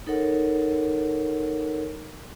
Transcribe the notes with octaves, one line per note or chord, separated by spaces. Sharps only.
D#4 A4 A#4 C#5 F#5